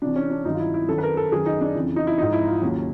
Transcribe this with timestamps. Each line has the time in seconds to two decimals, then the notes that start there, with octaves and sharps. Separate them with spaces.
0.02 C2 C3 E3 D4
0.16 C#4
0.30 D4
0.45 G2 D#3 F#3 D#4
0.54 F4
0.60 E4
0.74 E4
0.88 F#2 D#3 F#3 A4
0.98 B4
1.03 A#4
1.17 A4
1.32 F#2 D#3 F#3 G#4
1.46 D#4
1.61 D4
1.75 F2 C#3 E3
1.96 D#4
2.07 E4
2.18 G#2 F3 D#4
2.33 E4
2.47 F4
2.62 D#2 C#3 F#3